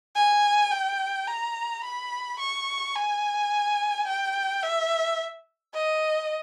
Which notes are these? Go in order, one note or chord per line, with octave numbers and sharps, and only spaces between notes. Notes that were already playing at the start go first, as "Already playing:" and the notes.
G#5
G5
A#5
B5
C#6
G#5
G5
E5
D#5